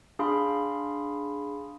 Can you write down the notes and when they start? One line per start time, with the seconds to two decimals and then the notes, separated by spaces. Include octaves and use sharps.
0.19 D4 G#4 F5 B5 C6